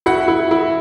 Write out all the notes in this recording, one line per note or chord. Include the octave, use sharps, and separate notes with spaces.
E4 F#4 F#5
E4
E4